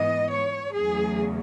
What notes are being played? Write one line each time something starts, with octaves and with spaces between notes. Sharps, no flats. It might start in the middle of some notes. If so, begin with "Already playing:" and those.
Already playing: G#2 E3 B3 D#5
C#5
E2 C#3 F#3 A3 G#4